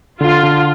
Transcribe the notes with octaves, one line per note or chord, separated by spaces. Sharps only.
D3 F4
D3